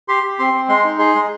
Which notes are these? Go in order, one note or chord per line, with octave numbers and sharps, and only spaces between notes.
G4 C6
G4
C4 C6
C4
G#3 C6
D#4
G#4 C6
G#3